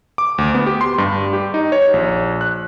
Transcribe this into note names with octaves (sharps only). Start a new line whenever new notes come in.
D6
D2
B3
G4
C6
G2
G4
D#4
C#5
A#1
F#6